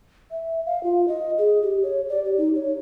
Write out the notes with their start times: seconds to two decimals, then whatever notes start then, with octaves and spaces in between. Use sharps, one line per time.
0.31 E5
0.66 F5
0.83 F4
1.08 D#5
1.38 G#4
1.62 G4
1.83 C#5
2.09 D5
2.24 G4
2.37 D#4
2.55 C#5